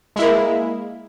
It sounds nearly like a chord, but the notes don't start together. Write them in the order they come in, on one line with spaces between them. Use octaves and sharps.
G#3 E4 A#3